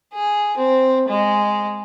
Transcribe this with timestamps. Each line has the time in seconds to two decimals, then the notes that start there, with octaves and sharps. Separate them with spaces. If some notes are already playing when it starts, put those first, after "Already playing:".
0.13 G#4
0.57 C4
1.08 G#3